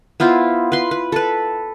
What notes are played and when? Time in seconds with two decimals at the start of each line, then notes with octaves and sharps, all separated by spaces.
0.20 B3 E4 F4 C5
0.72 B4 C6
0.91 B4
1.12 A4 B4